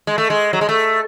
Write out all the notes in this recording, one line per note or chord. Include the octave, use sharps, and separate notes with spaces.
G#3
A3
G#3
F#3
G#3
A3